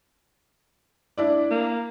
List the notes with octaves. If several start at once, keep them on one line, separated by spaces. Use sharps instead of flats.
D4 E4 D5
A#3